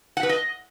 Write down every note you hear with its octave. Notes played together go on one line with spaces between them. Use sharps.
F#5
B4
D#5